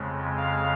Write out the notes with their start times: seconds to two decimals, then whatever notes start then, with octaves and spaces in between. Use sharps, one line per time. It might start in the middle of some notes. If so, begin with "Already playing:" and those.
Already playing: F2 C#3 G#3
0.37 F5